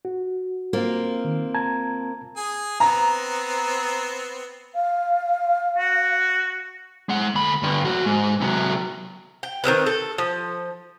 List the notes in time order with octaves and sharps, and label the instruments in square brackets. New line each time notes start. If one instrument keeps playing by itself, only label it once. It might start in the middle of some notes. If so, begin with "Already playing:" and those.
[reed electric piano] F#4
[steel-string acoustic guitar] A#3 C4 F4
[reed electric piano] D#3
A5 A#5 G#6
[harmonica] G#4 G#5
[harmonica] B3 C4 [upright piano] A#5
[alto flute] F5
[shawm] F#4
[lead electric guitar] G#3 F#5
D2 B5
G2 D3
F2 F#4
G#2
C3 F#3
[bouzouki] G5
D#3 F3 C4 B4
A4
F3